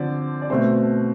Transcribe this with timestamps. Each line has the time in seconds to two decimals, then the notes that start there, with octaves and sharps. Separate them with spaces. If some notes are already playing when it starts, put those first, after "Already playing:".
Already playing: D3 F3 C4 C5 D5
0.42 D5
0.50 B2 A3 C4 C5